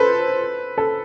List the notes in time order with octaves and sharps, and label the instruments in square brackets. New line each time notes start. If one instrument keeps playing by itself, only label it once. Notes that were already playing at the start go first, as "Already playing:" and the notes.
Already playing: [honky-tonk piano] A4 B4 C5
A4